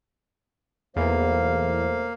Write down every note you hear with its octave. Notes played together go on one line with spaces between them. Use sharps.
B1 E2 A3 A#3 C5 F5